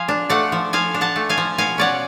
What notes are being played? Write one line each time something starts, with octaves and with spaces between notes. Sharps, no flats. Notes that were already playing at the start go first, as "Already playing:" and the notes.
Already playing: F3 F5 G#5
D4
A3 D5 F#5
F3
F3 F5 G#5
D4
F#5 A5
A3
F5 G#5
F3
B2 F5 G#5
C#4 D5 F#5